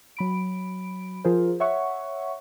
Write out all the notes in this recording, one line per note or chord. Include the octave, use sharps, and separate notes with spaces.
F#3 B5 D7
F3 F4 G#4 A#4 C5
C#5 E5 F#5 C#6